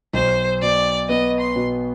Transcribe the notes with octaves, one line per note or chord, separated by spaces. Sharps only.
B1 C5
B2 D5
B3 D#5
C6
B2